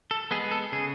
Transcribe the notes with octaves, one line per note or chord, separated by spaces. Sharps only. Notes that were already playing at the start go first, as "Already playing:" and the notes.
A4
G#3 B3 G#4
A4
C#3 G#4